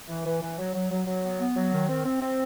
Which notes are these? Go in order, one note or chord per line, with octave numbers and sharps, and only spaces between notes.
E3
E3
E3
F#3
F#3
F#3
F#3
B3
B3
F#3
D#3
C4
C4
C4